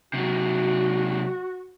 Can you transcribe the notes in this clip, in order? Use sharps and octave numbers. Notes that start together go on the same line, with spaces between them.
C3 F#3 F#4